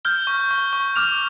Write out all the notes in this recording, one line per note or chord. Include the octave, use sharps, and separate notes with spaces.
F6 G6 G7
C#6
C#6
C#6
D6 F6 F7